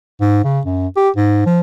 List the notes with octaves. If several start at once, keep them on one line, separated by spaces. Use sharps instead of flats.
G#2
C#3
F#2
G4
G#2
F3